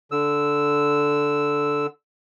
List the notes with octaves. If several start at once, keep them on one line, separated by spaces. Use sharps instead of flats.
D3 E6